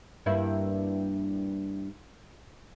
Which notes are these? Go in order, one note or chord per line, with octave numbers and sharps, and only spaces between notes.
G2 A#3 E4